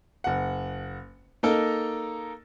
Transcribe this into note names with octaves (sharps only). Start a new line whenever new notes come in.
F#1 F#5
A#3 D#4 A4 A#4